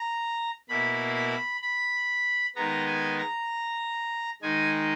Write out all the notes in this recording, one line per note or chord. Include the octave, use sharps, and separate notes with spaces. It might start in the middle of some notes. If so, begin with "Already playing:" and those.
Already playing: A#5
B2 A#3 E4 B5
B5
B5
D#3 G#3 B3 A#5
G#5
A#5
D#3 G#3 D#4 G#5